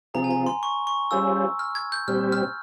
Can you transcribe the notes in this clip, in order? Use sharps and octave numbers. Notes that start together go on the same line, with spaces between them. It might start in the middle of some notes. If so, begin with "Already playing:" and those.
C3 F3 C4 F4 G#4 A#5
G#5
A#5
C6
C#6
C#6
G3 C#4 F4 G#4 C5 E6
F6
G#6
G6
A#2 G3 C4 G4 C5 F6
F6